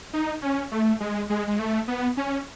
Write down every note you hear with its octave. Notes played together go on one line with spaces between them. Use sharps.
D#4
C#4
A3
G#3
G#3
G#3
A3
B3
C#4